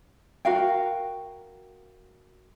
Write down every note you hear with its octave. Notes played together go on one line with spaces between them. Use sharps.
F#4 A#4 F5 G5